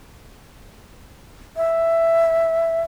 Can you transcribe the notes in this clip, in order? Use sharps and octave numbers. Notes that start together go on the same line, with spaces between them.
E5